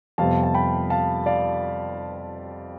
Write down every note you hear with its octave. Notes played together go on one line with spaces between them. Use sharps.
F2 C3 G3 B3 F5 A5
A5
G5 B5
F5 A5
D5 F5